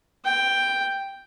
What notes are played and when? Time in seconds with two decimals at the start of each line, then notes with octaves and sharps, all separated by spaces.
0.25 G5